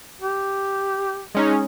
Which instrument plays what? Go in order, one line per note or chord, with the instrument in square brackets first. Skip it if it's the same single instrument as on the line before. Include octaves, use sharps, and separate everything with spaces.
[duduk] G4
[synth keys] G#3 C#4 D#4 [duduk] G#4